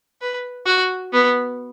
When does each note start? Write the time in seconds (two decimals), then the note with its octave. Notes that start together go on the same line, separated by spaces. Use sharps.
0.21 B4
0.66 F#4
1.13 B3